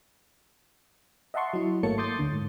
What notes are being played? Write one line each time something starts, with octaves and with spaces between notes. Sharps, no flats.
D#5 E5 F#5 A5 C6 C#6
F#3 E4
G#1 A3 A#3 C#5 A5 C#7
C6 D6 D#6 G6 A6 C7
D2 D3
G#2